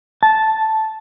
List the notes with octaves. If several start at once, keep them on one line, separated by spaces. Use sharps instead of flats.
A5